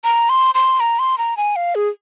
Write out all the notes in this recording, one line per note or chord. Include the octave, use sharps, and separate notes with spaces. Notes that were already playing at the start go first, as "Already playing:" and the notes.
A#5
C6
C6
A#5
C6
A#5
G#5
F5
G#4